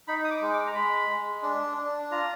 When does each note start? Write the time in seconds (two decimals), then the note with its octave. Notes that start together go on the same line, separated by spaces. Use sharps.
0.08 D#4 B5
0.24 D#6
0.31 D6
0.41 G#3
0.53 D6
0.67 A#5
0.75 G#3 B5
1.10 G#3
1.43 D4
1.77 D4
2.11 F4 A#5